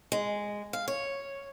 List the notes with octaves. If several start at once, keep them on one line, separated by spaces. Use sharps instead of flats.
G#3
F5
C#5